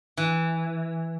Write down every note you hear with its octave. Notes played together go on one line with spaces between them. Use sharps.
E3